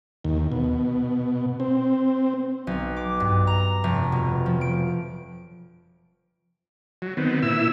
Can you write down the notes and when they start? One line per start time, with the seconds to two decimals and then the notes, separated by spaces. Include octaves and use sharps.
0.25 D#2
0.52 B2
1.60 C4
2.67 B1
2.96 D6
3.20 G2
3.47 A#5
3.84 F1
4.12 B2
4.46 F3
4.61 D7
7.02 F#3
7.17 D#3 B3 C4
7.42 A#2 E4 E6